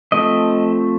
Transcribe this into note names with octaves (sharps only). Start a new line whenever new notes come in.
F3 A3 C4 D#5